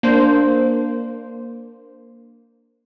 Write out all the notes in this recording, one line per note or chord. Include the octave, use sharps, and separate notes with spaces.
A#3 D4 C5